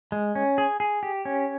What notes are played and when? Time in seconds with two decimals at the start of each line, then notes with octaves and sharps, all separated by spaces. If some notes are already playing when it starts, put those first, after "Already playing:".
0.12 G#3
0.35 C#4
0.58 G#4
0.80 G#4
1.03 G4
1.25 C#4